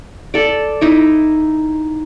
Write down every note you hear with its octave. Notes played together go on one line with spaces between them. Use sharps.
A4 D5
D#4 E4 D#5 D6